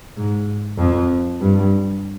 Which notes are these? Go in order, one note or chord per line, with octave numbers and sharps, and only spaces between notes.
G#2
F2
G2